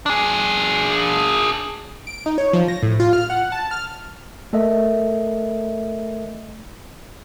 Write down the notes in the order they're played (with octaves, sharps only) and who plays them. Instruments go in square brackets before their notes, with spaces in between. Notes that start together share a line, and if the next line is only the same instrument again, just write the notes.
[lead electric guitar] D4 G#4
[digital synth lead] D7
D#4
C#5
F3
A#6
A2
F4
F6
F#5
A5
F6
[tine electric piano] A3 A4 A#4 D#5 E5